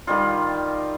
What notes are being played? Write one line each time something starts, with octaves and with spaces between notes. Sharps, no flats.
D#3 G3 F4